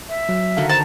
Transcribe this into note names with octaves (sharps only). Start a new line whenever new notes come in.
E5
F#3
D3 D#3 F#4 F5
C5 A5 A#5 A6